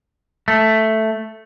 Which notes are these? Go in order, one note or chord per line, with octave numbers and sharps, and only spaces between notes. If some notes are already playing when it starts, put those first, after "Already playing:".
A3